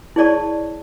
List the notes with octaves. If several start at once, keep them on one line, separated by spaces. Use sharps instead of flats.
E4 G#4 C#5 D5 A5 C#6